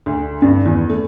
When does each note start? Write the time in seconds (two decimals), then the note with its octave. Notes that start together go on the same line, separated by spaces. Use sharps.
0.06 D2
0.42 G2
0.65 E2
0.89 A3